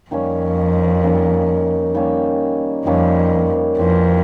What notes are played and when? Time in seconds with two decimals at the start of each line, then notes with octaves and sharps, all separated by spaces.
0.11 F2 D#3 G3 A#3 C#4
1.03 D#3 G3 A#3 C#4
1.94 D#3 G3 A#3 C#4
2.86 F2 D#3 G3 A#3 C#4
3.78 F2 E3 G3 C4